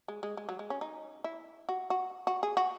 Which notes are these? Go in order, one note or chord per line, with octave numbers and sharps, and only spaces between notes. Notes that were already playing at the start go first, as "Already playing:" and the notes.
G#3
G#3
G#3
F#3
G#3
C#4
D#4
E4
F#4
F#4
F#4
G#4
F#4